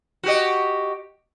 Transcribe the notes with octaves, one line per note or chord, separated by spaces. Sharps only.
F#4 G4 D#5